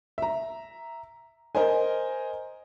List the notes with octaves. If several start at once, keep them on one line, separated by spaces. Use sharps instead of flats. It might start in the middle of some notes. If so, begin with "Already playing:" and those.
E5 A#5
A#4 C5 D#5 G#5